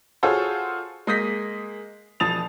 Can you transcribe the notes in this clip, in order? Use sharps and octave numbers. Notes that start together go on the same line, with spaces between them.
F4 F#4 G#4 A4 C5 C#5
G#3 A#3 D#6 G6 A#6 B6
E1 F3 A5 D#6 A6 F7